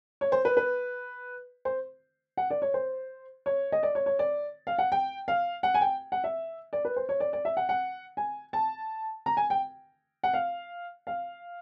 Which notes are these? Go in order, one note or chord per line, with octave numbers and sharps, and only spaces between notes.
C#5
C5
B4
B4
C5
F#5
D5
C#5
C5
C#5
D#5
D5
C#5
C#5
D5
F5
F#5
G5
F5
F#5
G#5
G5
F#5
E5
D5
B4
C5
C#5
D5
D5
E5
F#5
F#5
G#5
A5
A#5
G#5
G5
F#5
F5
F5